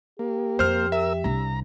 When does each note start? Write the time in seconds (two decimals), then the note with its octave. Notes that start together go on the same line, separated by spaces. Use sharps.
0.19 A#3 G4
0.59 F2 C5 F6
0.92 A#4 E5 E6
1.24 C2 D4 A#5